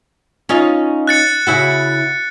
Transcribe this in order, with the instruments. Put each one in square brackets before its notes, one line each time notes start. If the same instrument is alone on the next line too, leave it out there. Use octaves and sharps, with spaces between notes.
[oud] C#4 D#4 F4
[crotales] F#6 A6 C#7
[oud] C#3 E4 F#4